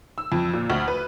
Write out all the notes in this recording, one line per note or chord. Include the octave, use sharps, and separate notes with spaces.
E6
F2
A#2
D2
B4